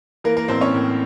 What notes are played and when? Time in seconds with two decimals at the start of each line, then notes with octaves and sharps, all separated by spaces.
0.24 E3 A#3 A#4
0.37 A#3 A#4
0.48 A1 C4 C5
0.61 C#4 C#5
0.74 A2